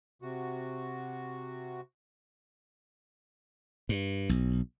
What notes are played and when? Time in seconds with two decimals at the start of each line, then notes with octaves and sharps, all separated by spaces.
0.22 C3 F#4
3.89 G2
4.29 B1